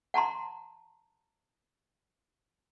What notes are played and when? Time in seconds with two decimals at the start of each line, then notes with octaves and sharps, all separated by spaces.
0.14 F#5 A5 A#5 C6